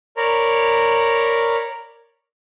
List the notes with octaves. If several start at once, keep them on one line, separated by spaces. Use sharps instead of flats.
A#4 C#5 D5 A#5 B5